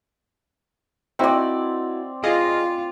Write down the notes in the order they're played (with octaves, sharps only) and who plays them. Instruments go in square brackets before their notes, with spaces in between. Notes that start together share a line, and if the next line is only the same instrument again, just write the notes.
[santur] C4 D5 [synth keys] D#4 E4 F#4
[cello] F4 [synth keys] G#4 D#5 F5